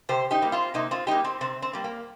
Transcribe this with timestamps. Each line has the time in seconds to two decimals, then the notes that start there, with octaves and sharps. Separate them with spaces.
0.09 C3 G4 C5
0.31 D#4 G4
0.42 G3 A#3
0.52 C4 F4
0.74 C3 A#3 D#4
0.91 C4 F4
1.07 G3 A#3 D#4 G4
1.24 C4
1.41 C3 C4
1.62 C4
1.73 G3 A#3
1.84 A#3